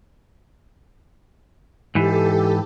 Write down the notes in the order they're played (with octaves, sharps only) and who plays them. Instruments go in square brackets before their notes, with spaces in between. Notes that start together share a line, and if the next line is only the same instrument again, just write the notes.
[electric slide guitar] G#2 E3 [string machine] G4 A4